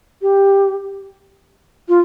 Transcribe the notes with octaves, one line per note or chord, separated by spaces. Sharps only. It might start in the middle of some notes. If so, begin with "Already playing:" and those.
G4
F4